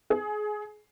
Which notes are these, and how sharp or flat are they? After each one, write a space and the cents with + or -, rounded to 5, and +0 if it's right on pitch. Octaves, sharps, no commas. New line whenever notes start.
G#4 +20